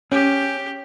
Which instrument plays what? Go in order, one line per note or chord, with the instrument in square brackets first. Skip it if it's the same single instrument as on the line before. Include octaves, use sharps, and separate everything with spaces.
[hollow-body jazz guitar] C#4 [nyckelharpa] G4